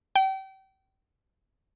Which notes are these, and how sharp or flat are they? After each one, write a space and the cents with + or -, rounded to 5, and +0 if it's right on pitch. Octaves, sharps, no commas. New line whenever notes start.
G5 -35